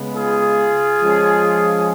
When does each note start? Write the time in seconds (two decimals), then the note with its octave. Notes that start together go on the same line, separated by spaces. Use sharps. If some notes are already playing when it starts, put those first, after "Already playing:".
Already playing: C#3 G#3 B3
0.16 F4 G#4
0.99 F3 G#3 C#4